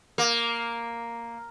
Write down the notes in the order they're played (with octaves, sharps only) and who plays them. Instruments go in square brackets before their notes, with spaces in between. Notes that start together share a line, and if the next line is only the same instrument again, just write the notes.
[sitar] A#3